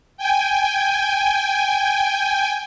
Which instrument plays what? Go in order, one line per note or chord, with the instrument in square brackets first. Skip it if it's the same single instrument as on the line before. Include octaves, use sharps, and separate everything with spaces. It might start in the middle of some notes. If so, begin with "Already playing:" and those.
[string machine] G5 G#5